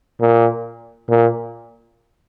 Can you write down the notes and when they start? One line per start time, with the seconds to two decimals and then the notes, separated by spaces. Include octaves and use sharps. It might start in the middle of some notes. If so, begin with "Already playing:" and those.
0.21 A#2
1.10 A#2